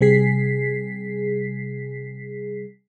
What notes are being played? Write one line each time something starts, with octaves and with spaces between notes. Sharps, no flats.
C3 G3 G#4 B6 C7